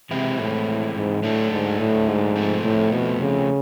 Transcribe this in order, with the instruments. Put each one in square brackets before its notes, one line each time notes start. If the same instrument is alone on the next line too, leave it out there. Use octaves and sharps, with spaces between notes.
[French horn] C3 [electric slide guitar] E3 G#3 C4 E4
[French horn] A2
G#2
[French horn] A2 [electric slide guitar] F#3 A3 D4
[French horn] G#2
A2
G#2
[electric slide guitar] F3 A3 C4
[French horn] A2
B2
C#3